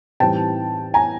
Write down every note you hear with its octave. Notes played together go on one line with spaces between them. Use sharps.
A2 E3 G3 C4 D#4 G5 A5
G#5 A#5